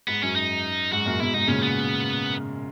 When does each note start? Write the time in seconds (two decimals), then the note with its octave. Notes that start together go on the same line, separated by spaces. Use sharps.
0.08 G#2 B3
0.22 F#2 C#4
0.36 D#4
0.92 G#2 F#4
1.06 F#2 A#2
1.20 G#2 B2 E4
1.34 G#2 B2 D#4
1.48 A#2 C#3 C#4
1.63 B3